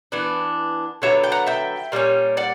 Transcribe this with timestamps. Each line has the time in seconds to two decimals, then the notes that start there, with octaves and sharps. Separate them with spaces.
0.12 E3 B3 D4
1.02 D3 F#3 B3 C#5 E5
1.24 G5
1.32 F#5 A#5
1.46 E5 G5
1.92 A#2 G3 A#3 C#4
2.37 D5 F#5